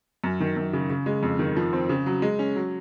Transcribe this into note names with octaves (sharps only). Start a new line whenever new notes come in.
F#2
D#3
F#2
C#3
C#3
G#3
F2
D#3
F3
C4
C#3
F#3
G#3
C#4
F#3